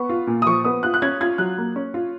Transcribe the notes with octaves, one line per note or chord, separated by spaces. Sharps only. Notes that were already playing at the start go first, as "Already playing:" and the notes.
Already playing: B3 C#6
F4
A#2
D#6
F3 C#6
B3 D#6
F4 F#6
F#6
C#4 G#6
F4 G#6
F#3 F#6
A#3
C#4
F4